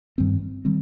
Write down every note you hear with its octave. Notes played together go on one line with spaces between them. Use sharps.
G2 D#3 G3 C4
D#3 G3 C4